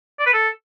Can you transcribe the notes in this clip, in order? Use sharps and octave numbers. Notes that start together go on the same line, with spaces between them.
D5
B4
A4